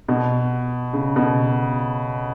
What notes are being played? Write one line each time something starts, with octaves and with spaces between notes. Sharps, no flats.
B2
C#3
B2